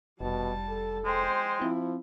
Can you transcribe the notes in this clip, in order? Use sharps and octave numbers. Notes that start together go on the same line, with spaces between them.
F1 B2 G3 A5
A4
G#3 C5 G5
F3 C4 E4